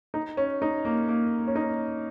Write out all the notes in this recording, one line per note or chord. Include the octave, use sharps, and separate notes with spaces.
D#4
C#4
D#4
A#3
A#3
C#4
D#4